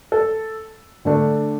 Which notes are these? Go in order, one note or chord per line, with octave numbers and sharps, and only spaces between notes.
A4
D3 A3 D4